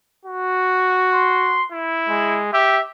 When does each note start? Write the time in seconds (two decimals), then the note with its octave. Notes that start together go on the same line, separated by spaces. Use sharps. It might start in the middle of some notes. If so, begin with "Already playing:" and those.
0.25 F#4
1.13 C6
1.72 E4
2.09 G#3
2.53 G4 E5